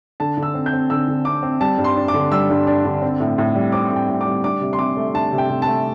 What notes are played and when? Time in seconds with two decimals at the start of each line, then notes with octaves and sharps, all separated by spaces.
0.20 D3 A5
0.37 D3
0.43 E6
0.54 C4
0.66 G6
0.73 C4
0.90 D3 E6
1.08 D3
1.25 C4 D6
1.43 C4
1.61 G3 A5
1.78 G2
1.84 C6
1.96 D4
2.08 D6
2.14 D3
2.32 G3 E6
2.50 G2
2.67 D4
2.85 D3
3.02 C4
3.20 A2
3.38 A2
3.55 G3
3.72 C4 D6
3.91 A2 G5
4.08 A2
4.21 D6
4.26 G3
4.43 D4 D6
4.61 C3
4.73 C6
4.79 C3 D6
4.97 A3
5.14 D4 A5
5.32 C3
5.38 G5
5.50 C3
5.62 A3 A5